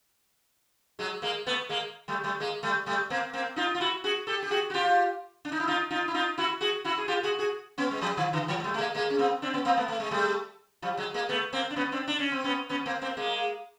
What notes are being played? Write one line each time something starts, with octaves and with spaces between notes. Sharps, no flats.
F#3 G#3
G#3 A#3
A3 B3
G#3 A#3
G3 A3
G3 A3
G#3 A#3
G3 A3
G3 A3
A#3 C4
A#3 C4
D#4 F4
F4
E4 F#4
F#4 G#4
G4 A4
G4
F#4 G#4
F#4
F4 G4
D4
D#4
E4
D#4 F4
D#4 F4
E4
D#4 F4
E4 F#4
F#4 G#4
E4 F#4
G#4
F4 G4
F#4 G#4
F#4 G#4
B3 C#4
G#3
F3 G3
D#3 F3
D3 E3
E3 F#3
G#3
G3 A3
A3
G#3 A#3
G#3 A#3
C#4
A#3 C4
C4 D4
B3 C#4
A#3 C4
A3 B3
A3
G#3
G3 A3
F3 G3
F#3 G#3
G#3 A#3
A3 B3
A#3 C4
D4
B3 C#4
C4 D4
D4
C#4
C4
B3 C#4
B3 C#4
A#3 C4
A#3 C4
G#3 A#3